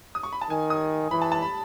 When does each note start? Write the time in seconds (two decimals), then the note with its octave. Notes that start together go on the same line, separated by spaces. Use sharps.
0.15 D#6
0.23 C#6
0.32 B5
0.41 A5
0.50 D#3 G#5
0.70 D#6
1.11 E3 B5
1.22 A5
1.32 A5
1.42 B5